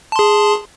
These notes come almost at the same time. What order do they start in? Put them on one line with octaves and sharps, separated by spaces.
A5 C6 G#4